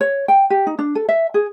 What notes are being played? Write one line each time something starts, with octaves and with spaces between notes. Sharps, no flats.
C#5
G5
G4
D#4
D4
A4
E5
G#4